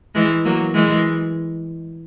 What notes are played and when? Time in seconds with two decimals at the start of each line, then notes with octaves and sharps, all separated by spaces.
0.15 E3 G#3
0.45 F#3 A#3
0.74 E3 G#3